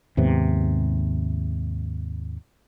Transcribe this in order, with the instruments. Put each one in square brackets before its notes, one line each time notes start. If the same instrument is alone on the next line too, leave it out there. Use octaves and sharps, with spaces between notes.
[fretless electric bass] D#2 G#2 C3 B3